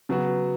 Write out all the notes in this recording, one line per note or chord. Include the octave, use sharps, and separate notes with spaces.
C#3 F#3 B3 F#4